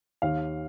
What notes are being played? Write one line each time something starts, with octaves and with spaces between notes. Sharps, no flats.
D#2 F5